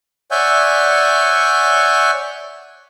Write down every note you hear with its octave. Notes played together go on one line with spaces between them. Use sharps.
C#5 D5 E5 F#5 G#5 G6